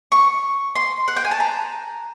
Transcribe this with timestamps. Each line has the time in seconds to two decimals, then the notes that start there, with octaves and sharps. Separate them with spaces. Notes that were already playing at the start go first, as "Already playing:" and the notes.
0.12 C#6
0.76 C6
1.08 F#5
1.16 G5
1.25 G#5
1.31 A5
1.40 A#5